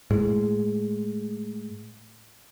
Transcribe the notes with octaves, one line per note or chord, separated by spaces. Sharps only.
A2 G#3